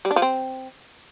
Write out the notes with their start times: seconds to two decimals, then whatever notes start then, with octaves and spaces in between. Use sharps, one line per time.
0.05 G3
0.11 D4
0.16 F3
0.22 C4